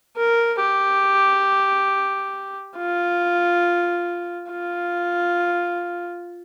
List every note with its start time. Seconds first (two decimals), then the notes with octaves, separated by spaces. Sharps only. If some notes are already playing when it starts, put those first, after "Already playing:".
0.17 A#4
0.60 G4
2.78 F4
4.51 F4